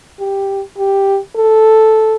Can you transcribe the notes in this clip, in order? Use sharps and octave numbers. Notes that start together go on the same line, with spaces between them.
G4
G4
A4